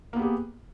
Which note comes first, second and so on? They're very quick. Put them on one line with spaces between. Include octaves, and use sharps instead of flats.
A#3 B3 G4 G#4